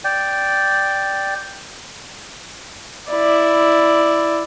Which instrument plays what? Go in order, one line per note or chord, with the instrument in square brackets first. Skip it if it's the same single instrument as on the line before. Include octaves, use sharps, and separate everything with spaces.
[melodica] D5 G5
[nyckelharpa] E4 D5